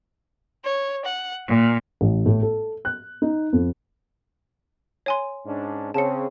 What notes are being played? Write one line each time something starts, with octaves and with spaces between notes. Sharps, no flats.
C#5
F#5
A#2
A1
A2
A4
F#6
D#4
F2
C#5 G#5 C6
G#2 C#4 D4
C#3 C4 C#4 A5 C#7